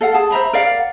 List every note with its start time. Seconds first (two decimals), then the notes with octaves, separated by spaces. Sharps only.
0.01 A4 F5 F#5
0.14 G#4 A5
0.31 C5 E5 A#5 B5
0.53 A#4 D5 F5 F#5